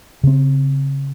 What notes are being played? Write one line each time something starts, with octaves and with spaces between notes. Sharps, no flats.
C#3 C4